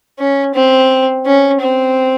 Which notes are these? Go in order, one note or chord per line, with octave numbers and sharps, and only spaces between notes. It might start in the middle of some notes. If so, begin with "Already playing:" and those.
C#4
C4
C#4
C4